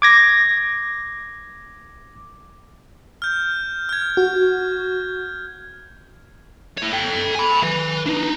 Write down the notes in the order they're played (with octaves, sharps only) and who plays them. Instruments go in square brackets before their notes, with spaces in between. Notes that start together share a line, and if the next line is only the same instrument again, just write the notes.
[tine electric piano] D6 G#6 A#6
[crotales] F6 G6
F6 G#6
[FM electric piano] F#4
[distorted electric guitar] E4 C#5
A4 G5
G#5 B5
B4 G#5
D4 D#4